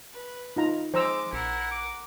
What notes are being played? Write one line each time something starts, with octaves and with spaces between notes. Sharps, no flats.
B4
D#4 F4 A#5
F3 G#3 C5 A#5 D6 E6
A#1 E4 A#4 F#5
D6